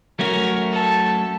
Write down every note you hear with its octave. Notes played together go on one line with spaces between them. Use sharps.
F#3 A3 C#4 F#4 A#4
A4